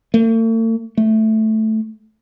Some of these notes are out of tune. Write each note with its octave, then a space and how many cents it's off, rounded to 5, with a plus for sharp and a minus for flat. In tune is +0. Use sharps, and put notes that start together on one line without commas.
A3 +45
A3 -5